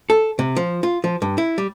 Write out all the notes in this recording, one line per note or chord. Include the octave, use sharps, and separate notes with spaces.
A4
C3
F3
F4
F3
G2
E4
G3